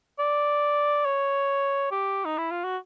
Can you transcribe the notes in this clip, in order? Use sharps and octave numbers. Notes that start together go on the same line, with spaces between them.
D5
C#5
G4
D#4
E4
F4
F#4